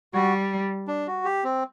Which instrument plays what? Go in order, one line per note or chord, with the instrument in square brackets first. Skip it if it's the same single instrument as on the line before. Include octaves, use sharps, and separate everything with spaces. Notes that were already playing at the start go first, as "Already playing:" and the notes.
[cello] G3 [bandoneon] F#4
[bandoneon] D4
F#4
G4
C4